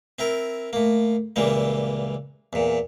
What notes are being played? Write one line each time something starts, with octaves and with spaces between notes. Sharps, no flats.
C4 E4 A#4
A2 A#3
C#2 A#2 E3 G3 A#3
E2 A#2